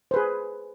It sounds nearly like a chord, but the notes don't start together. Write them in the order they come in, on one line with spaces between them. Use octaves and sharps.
C5 B4 G#4